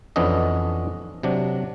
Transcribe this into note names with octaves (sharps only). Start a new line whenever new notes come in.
F2 E3 B3 C#4 D4 D#5
C3 F#3 D4